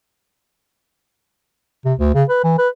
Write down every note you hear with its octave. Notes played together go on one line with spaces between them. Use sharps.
C3
D2
C#3
B4
E3
B4